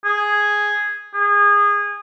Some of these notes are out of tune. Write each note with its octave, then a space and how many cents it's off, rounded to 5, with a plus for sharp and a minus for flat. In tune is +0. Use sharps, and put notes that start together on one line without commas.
G#4 +0
G#4 -25